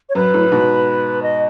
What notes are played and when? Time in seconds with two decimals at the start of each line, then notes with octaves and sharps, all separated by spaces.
0.09 C#5
0.15 F#2 B4
0.34 F#2 A2
0.47 A2
0.52 G#2 B2
1.23 D#5